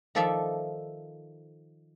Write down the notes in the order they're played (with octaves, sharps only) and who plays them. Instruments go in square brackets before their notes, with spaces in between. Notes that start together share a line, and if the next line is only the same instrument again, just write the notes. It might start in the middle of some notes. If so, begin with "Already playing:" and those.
[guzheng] D#3 F3 A4 D5 E5 F5